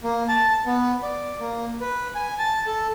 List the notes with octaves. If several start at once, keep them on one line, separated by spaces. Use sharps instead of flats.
A#3
A5
B3
D5
A#3
B4
G#5
A5
A4